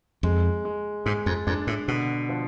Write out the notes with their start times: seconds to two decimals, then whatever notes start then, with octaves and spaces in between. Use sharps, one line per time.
0.23 F2 G#3
0.65 G#3
1.06 G#2 G#3
1.26 F2
1.47 F2 D4
1.67 A2
1.88 B2 D3
2.29 F3